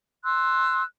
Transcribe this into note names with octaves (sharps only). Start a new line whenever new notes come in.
C6 E6 F#6